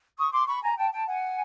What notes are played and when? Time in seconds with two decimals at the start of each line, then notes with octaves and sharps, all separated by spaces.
0.17 C#6 D#6
0.32 C6 D6
0.46 B5 C#6
0.62 G#5 A#5
0.77 G5 A5
0.92 G5 A5
1.07 F#5 G#5